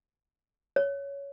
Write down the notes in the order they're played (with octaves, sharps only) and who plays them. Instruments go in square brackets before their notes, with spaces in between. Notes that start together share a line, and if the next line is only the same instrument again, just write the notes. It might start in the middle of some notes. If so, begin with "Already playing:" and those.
[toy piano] C#5